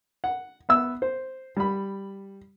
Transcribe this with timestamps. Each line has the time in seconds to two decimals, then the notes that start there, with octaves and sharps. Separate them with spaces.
0.24 F#5
0.69 B3 E5 E6
1.02 C5
1.57 G3 B5